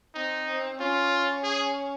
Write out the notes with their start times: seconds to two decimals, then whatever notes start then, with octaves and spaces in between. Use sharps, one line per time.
0.15 C4 D#4
0.47 C4
0.79 C#4 F4
1.44 G#4